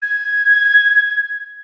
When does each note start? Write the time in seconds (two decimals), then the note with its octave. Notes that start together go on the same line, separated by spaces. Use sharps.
0.02 G#6